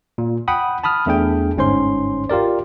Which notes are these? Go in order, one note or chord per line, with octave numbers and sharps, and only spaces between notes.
A#2
F#5 G5 B5 D#6
A5 B5 D#6 F6
E2 A3 D4 G#4 G5
G1 G#2 C#4 C5 C6
F4 G4 A#4 D5